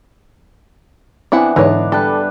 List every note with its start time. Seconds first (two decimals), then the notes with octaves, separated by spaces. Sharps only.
1.32 E3 B3 C4 D4 E4 F#5
1.56 G#2 D3 E3 D4 D#4 C#5
1.92 G3 D4 A4 B4